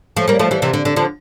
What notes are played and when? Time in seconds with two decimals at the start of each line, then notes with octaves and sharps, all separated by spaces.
0.17 F3 A3
0.28 G3 A#3
0.39 F3 A3
0.51 E3 G3
0.62 C3 E3
0.73 D3
0.85 D3
0.96 D3 F3